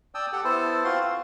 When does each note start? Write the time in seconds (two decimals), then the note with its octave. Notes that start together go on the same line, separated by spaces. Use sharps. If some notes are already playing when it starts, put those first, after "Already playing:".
0.15 D5 G5 A5 D#6 E6
0.32 G4 A4 F#5
0.44 B3 E4 A4 C5
0.84 C4 F4 F#4 C6
1.03 F5